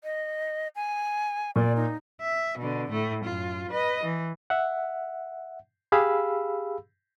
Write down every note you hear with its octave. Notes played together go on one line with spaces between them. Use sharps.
D#5
G#5
A#2 D5
D#4
E5
B2 D3
A2 A3
F#2 F4
B4 D#5
E3
E5 F#5
G4 G#4 F5 B5 E6